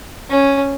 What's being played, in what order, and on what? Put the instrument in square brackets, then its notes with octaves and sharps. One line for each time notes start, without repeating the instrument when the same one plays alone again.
[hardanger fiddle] C#4